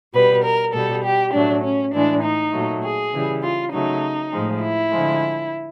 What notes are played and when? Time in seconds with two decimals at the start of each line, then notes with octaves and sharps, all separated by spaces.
0.14 B2 G3 B4
0.44 A#4
0.73 B2 G3 A4
1.04 G4
1.33 A2 F#3 A3 D4
1.63 C#4
1.93 A2 E3 G#3 D4
2.23 D#4
2.53 A#2 F#3 A3
2.83 G#4
3.13 C#3 E3 G3
3.43 F4
3.72 C#3 F#3 A3 D#4
4.32 A2 F3 G#3
4.62 E4
4.92 D3 F3 G#3